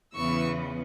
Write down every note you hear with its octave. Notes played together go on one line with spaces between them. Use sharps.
E2 C#3 E3 B3 C#6 E6